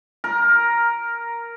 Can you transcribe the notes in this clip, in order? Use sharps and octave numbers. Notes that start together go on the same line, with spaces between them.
A#4